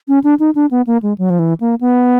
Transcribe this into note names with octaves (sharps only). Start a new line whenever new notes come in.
C#4
D4
D#4
D4
B3
A#3
G#3
F#3
F3
E3
A#3
B3